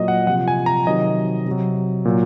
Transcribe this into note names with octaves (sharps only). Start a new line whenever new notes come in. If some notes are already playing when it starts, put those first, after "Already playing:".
Already playing: A#2 F#3 D#5
F#5
C3 F3 F#5
G#5
A#5
C3 D#3 F#3 D#5
C3
F#3
A#2 F#3